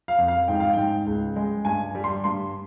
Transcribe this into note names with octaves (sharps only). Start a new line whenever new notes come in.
F5
F2
F5
G#2 G5
F5
G#2 G5
C#2
G#3
G2 G#5
G3
C6
G2 C6